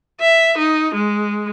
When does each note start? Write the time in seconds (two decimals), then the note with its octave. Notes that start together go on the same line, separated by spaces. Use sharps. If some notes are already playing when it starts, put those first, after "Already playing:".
0.21 E5
0.58 D#4
0.95 G#3